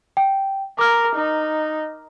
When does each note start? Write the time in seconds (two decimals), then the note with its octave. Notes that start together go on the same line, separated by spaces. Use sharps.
0.17 G5
0.79 A#4 D6 F6
1.15 D#4